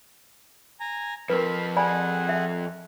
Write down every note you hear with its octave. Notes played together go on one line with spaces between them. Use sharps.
G#5 A#5
F2 F3 A#4 B4 B5
G#4 D5 F#5 G#5 B5
E5